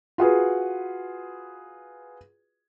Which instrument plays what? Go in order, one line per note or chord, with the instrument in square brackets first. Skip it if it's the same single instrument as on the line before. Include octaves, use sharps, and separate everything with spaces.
[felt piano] F4 F#4 G#4 B4